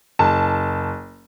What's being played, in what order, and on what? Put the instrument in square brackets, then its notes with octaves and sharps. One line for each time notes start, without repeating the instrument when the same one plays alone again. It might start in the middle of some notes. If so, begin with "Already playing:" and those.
[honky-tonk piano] F#1 A5